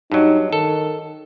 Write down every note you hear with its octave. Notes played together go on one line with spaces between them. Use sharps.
G2 F#3 D#4
D#3 A4